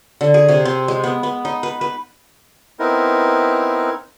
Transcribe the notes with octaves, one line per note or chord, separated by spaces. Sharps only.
D3
G#4
C3
C4
G#3
B3
B3
D#4
B4
B4
B3 C4 D#4 E4 A#4